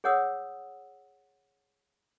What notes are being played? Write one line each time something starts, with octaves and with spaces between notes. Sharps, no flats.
G#4 C#5 F#5 D#6 E6